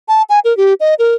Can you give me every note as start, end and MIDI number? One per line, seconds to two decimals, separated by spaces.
0.08 0.23 81
0.29 0.39 80
0.45 0.56 70
0.57 0.74 67
0.80 0.94 75
0.99 1.15 70